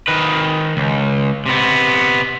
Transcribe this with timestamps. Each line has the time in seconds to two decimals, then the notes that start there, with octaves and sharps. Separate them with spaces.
0.08 D#3 B4
0.77 C#2
1.46 C3 B3